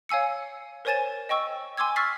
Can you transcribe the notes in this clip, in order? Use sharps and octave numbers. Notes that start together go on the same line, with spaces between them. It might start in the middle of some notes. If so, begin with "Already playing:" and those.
C#5 F5 G#5 E6 C#7
A#4 C5 C#5 G#5 A6 E7
D#5 G5 C#6 E6
G#5 C6 D6 E6 G#6
C#6 E6 F6 A6 B6 C7